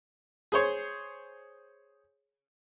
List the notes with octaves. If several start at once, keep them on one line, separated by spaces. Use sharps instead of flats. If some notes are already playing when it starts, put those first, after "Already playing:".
G#4 C5 C#5